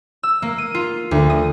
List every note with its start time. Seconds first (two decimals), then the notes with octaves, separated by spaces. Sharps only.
0.23 E6
0.42 A#3
0.58 D#7
0.75 F4
1.11 D2
1.30 D#6